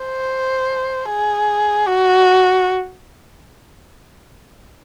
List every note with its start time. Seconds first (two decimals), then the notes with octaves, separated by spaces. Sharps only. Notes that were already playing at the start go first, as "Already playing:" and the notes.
Already playing: C5
1.09 G#4
1.88 F#4